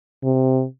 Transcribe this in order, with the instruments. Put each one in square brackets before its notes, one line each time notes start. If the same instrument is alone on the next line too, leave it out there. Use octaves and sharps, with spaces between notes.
[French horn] C3